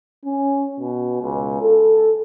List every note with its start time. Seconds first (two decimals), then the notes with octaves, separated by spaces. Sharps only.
0.25 C#4
0.80 B2
1.22 C#2
1.62 A4